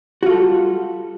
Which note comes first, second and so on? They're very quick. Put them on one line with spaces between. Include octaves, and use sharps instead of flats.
F#4 F4 A4 G3